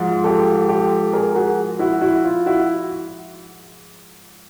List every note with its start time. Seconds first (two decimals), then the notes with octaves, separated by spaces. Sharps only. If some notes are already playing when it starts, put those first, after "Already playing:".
Already playing: G#2 F3 F#4
0.24 G4 A4
0.69 G4 A4
1.13 G#4 A#4
1.35 F#4 G#4
1.79 E4 F#4
2.01 E4 F#4
2.24 F4
2.46 E4 F#4